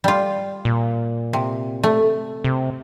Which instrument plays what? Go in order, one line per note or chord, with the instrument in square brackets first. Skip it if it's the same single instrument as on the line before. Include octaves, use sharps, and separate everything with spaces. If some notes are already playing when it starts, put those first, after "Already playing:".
[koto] G3 F4
[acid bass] A#2
[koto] C3
A3
[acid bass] C3